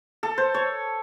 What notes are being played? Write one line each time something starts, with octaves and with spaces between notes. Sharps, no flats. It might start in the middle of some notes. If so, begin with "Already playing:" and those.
A4
C5
C#5